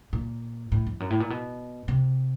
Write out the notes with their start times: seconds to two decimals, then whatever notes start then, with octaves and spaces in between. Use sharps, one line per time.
0.13 A#2
0.72 A2
0.87 F2
1.00 F#2
1.10 A2
1.20 A#2
1.30 B2
1.88 C3